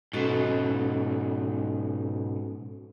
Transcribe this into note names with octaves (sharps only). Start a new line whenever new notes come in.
G#2 B2 C#4 F#4 A4